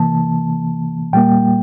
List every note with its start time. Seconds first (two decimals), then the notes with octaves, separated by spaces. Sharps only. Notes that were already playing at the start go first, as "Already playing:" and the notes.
Already playing: C3 E3 A#3 A5
1.13 A#2 G3 A#3 G5